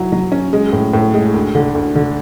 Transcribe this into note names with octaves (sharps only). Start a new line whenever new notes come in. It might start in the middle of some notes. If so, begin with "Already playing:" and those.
Already playing: F#3 E4
F#3
C#4
G#3
A2
A2
G#3
D2
D3
D2
D3